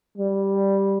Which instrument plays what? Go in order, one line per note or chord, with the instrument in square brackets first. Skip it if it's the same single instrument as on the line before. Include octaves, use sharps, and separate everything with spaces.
[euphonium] G3